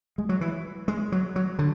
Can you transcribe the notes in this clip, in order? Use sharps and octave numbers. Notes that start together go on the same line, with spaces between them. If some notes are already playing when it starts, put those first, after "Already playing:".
G#3
F#3
E3
G#3
F#3
F#3
D3